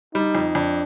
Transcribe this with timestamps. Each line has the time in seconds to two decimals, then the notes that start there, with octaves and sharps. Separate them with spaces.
0.14 G3 D#4
0.35 F2
0.55 F2 D4